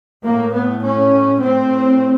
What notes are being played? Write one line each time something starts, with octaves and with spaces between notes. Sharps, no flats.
A2 A#3
B3
C#4
A2 C4